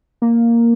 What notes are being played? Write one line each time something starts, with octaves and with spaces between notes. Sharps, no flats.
A#3